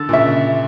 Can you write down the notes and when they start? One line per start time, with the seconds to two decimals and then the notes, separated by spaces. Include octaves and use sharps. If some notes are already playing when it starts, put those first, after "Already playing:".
Already playing: D3 A4
0.09 A#2
0.13 C#3 E5